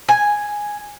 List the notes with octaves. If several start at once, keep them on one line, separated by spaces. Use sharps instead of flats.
G#5